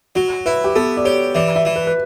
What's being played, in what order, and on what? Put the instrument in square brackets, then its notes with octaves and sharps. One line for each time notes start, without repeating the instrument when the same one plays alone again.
[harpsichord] F#3 [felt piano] F#4
[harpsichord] E4 [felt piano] B4
[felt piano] G4
[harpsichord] B3 [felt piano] A4
[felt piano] D5
[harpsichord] G4 [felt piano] C#5
[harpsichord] E3 [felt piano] D5
[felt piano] E5
[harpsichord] E3
[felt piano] B4
B4